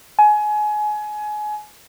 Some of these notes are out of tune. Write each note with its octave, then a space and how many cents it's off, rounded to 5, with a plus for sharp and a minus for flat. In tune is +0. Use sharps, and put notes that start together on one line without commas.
G#5 +25